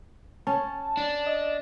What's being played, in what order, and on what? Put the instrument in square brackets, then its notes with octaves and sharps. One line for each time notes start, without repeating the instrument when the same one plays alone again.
[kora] C#4 [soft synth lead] A5
[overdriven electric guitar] D4
[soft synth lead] D#5